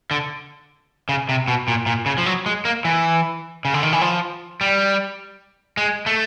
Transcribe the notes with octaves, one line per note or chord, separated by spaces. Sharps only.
D3
C#3
C3
B2
A#2
A#2
C#3
F3
F#3
G#3
A#3
E3
C#3
D3
D#3
E3
F3
G3
G#3
A3